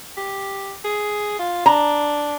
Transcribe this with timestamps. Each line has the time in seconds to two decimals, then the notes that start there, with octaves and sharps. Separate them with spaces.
0.17 G4
0.84 G#4
1.40 F4
1.66 D4 A#5